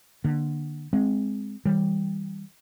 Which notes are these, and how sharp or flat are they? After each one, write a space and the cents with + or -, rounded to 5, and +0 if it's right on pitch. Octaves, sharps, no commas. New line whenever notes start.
D3 +25 A#3 +20
G#3 +0 C4 +0
E3 -35 G3 +5